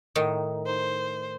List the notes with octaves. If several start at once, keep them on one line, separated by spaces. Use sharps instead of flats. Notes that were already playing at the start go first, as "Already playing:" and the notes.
A2 D#3 D#4
C5